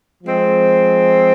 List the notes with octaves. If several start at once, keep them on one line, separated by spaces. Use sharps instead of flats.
F3 G#3 C4